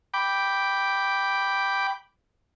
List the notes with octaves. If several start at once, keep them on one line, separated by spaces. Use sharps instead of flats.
G5 B5 D6